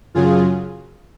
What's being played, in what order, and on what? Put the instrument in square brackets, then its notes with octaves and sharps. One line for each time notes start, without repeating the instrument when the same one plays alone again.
[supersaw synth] F#2 C#3 F#3 F4 G#4